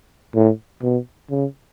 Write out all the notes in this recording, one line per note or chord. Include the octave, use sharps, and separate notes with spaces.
A2
B2
C#3